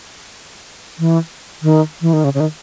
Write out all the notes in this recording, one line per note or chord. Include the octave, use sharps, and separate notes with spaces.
E3
D#3
E3
D#3
C#3
C#3
D#3